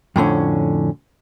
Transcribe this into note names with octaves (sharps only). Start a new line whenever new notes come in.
F2 A2 D3 C#4